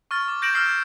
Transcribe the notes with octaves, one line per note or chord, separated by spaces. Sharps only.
C#6 F6 A6
D6
G6 A#6 D7 E7 F#7
E6 F6 G6 C7
G#6